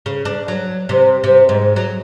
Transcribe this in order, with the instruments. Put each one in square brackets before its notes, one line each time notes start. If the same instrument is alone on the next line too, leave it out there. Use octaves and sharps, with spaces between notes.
[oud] C#3
D4
F#3
C3
C3
G#2
F#3